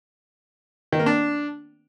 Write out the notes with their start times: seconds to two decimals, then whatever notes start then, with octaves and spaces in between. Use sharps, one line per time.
0.92 D#3
0.99 A#3
1.06 D4